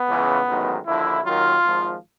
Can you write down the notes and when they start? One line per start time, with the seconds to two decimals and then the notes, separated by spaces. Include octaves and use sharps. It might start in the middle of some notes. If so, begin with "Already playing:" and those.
Already playing: B3
0.08 C#2 C#3 E3
0.48 A1 G#2 D#3 F#3
0.86 D#2 D3 F3 E4
1.24 D#2 D#3 F#3 F4
1.63 G#1 G#2 F3